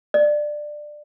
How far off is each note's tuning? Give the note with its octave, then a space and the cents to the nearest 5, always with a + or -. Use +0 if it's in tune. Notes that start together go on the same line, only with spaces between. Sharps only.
D5 +20